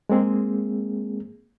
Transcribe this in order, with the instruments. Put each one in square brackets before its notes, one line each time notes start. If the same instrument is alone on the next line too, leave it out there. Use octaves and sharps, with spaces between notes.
[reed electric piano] G#3 A#3 C4 G#4